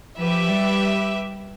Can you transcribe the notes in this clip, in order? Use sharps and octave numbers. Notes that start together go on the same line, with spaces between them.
F3 G4 B4 E5
G3